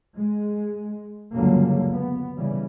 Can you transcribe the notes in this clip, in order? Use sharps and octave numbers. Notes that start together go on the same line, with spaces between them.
G#3
C#2 F#2 D3 G3 A#3
B3
C#3 E3 G3